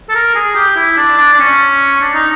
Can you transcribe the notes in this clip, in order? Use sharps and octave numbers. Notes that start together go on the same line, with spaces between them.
A4
A#4
G#4
G4
E4
D4
D4
D4
C#4
D4
D#4